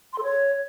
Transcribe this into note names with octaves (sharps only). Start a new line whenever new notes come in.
C6
A4
C#5